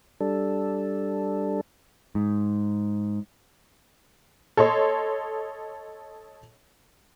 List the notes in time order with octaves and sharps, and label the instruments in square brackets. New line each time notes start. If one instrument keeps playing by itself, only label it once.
[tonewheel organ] G3 D4 A4
[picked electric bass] G#2
[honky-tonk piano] A4 C#5 D#5 C6